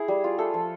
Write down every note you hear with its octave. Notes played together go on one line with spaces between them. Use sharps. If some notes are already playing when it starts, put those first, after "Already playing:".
Already playing: E4 G#4
G3
F4
A3 A4
F3